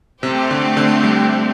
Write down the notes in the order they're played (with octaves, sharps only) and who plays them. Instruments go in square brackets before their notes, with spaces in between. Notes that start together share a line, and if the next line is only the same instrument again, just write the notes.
[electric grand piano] C3 [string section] A3 C4 G4
[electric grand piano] D3
D3
G3